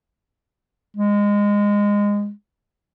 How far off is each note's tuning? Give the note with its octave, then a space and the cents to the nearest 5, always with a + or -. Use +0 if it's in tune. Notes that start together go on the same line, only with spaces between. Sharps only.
G#3 -20